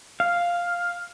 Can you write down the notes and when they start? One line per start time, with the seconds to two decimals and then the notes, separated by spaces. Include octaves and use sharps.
0.20 F5